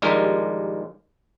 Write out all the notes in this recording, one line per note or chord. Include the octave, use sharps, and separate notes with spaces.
A#1 D#2 G3 G#3 A#4